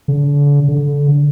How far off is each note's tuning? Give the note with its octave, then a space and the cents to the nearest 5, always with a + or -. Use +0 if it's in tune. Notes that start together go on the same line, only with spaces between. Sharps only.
D3 -40
D3 -20